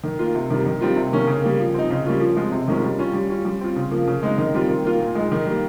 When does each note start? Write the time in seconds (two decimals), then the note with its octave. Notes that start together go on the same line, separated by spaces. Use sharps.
0.04 D#3
0.19 A#3 F4
0.35 C3
0.50 D#3 G3
0.66 D#3
0.81 G3 C4 F4
0.97 C3
1.13 D#3 A#3 C#4
1.27 C#3
1.43 G3 A#3
1.59 F3
1.74 C4 D#4
1.90 C#3
2.05 G3 A#3 C#4 F4
2.21 F3
2.36 G#3 C4 F4
2.52 C3
2.68 D#3 G#3 C#4 F4
2.83 G3
2.99 C#4 F4
3.13 G3
3.30 C#4 F4
3.45 G3
3.61 C4 F4
3.76 C#3
3.91 F3 A#3
4.07 C#3
4.23 G#3 C4 D#4
4.38 D#3
4.54 G3 C4 F4
4.69 D#3
4.85 A#3 F4
5.00 A#2
5.15 G#3 D#4
5.32 D#3
5.46 G3 A#3